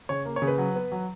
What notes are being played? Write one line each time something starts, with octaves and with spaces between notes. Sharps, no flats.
C#3 C#5
A#3
C#5
C#3
B4
F#3
B3
F#3